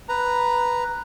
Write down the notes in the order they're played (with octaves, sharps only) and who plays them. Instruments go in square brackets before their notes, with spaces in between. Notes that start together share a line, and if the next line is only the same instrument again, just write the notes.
[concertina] B4 A#5